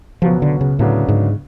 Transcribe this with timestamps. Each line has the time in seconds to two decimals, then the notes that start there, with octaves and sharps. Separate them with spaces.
0.22 C#2 B2 F3 F#3 B3
0.42 D3
0.61 C#3
0.79 D2 A2 C#3 F#3 B3 D4
1.08 G#2